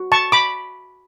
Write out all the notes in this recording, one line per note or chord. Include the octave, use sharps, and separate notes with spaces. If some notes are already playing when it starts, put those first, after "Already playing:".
Already playing: F#4
A5 C#6
B5 D6